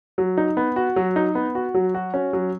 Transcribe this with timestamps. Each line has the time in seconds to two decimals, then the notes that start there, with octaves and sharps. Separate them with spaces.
0.18 F#3
0.37 D#4
0.57 B3
0.76 F#4
0.96 F#3
1.16 D#4
1.35 B3
1.55 F#4
1.74 F#3
1.94 F#4
2.14 C#4
2.33 F#3